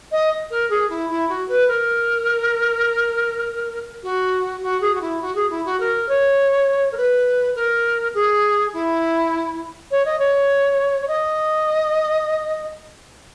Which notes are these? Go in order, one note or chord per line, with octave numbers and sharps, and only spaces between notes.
D#5
A#4
G#4
E4
E4
F#4
B4
A#4
F#4
F#4
G#4
F#4
E4
F#4
G#4
E4
F#4
A#4
C#5
A#4
B4
A#4
G#4
E4
C#5
D#5
C#5
C#5
D#5